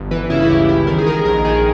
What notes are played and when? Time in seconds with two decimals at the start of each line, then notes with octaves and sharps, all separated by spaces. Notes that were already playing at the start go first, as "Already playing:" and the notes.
Already playing: G1
0.11 E3 B4
0.30 C#3 E4
0.42 E4
0.50 C#2 G4
0.68 C#2 E4
0.87 D#3 A#4
0.98 G#4
1.07 D#3 A#4
1.25 A#1 A#4
1.44 D#3 G#4